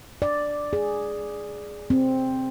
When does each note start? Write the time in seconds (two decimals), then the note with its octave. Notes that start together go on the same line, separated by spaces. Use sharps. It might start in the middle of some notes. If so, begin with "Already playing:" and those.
0.22 D5
0.73 G#4
1.90 C4